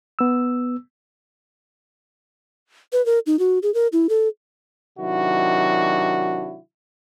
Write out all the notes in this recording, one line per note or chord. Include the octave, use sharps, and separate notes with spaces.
B3 E6
B4
A#4
D#4
F#4
G#4
A#4
E4
A4
C3 D#3 F#3 D4 E4 F#4